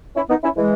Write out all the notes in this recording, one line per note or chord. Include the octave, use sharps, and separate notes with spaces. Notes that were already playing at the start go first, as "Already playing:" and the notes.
C#4 E4
B3 D#4
C#4 E4
E3 G#3